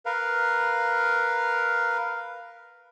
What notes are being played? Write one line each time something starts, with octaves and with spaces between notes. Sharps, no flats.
A#4 B4 F5